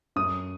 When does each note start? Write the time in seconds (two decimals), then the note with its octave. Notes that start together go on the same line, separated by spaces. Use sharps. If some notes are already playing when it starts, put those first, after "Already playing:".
0.16 F#2 D#6